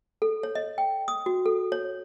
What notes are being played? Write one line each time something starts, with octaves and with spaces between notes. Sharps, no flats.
A4
C#5
D#5
G5
D#6
F#4
A4
C#5